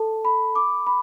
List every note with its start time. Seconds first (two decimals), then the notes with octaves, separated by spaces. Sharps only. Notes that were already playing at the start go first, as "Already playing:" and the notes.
Already playing: A4 A5
0.25 B5
0.55 D6
0.87 B5